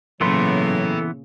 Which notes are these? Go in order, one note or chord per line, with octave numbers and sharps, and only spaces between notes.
A#2 C#3 E3 F#3 B3 A4 B5 C6